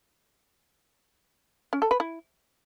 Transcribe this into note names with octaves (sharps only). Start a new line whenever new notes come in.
C#4
A4
B4
E4